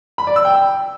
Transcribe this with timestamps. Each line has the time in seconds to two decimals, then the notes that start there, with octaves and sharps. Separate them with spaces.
0.18 B5
0.27 D5
0.36 E6
0.45 G5